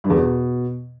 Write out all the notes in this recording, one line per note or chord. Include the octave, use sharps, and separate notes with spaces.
G2
E2
B2